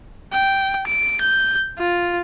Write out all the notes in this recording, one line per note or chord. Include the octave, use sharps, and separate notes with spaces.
G5
D7
G6
F4